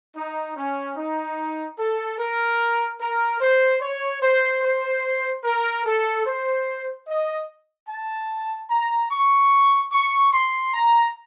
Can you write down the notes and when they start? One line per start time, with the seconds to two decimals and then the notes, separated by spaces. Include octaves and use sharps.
0.16 D#4
0.56 C#4
0.96 D#4
1.78 A4
2.18 A#4
3.00 A#4
3.40 C5
3.81 C#5
4.22 C5
4.63 C5
5.44 A#4
5.85 A4
6.25 C5
7.07 D#5
7.88 A5
8.70 A#5
9.11 C#6
9.92 C#6
10.33 C6
10.74 A#5